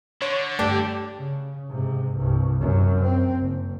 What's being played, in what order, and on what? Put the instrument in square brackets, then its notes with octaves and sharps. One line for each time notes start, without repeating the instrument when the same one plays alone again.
[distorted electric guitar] D3 [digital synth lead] C#5
[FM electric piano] G2 A3 [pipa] D4 [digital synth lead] G4
[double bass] C#3
G#2 C3
C2 G2
F#2 C3
C4
F#1